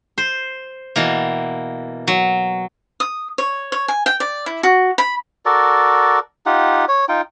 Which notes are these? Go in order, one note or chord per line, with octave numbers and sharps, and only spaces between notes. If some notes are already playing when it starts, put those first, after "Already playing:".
C5
B2 E3 A#3
F#3
D#6
C#5
C#5
G#5
G5
D5
E4
F#4
B5
F#4 A4 A#4 D5
D#4 F4 G4 F#5
C#5
D#4 F4 G5